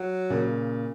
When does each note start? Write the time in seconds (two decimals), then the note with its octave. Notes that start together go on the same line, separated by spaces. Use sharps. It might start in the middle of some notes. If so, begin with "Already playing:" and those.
Already playing: F#3
0.30 A#2 C#3